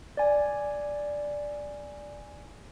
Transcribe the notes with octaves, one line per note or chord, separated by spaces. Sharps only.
D5 G#5